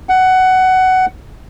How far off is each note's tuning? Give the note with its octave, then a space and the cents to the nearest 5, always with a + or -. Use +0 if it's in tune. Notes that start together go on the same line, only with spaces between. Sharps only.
F#5 +15